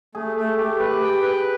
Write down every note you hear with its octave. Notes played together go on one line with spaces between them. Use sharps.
A3 G#4
A3
A3 G4
G4 B4
G4
G#4 G5
B4